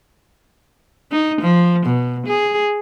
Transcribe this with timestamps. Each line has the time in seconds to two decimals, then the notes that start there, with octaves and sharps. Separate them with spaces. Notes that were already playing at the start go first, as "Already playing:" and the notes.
1.11 D#4
1.41 F3
1.86 B2
2.27 G#4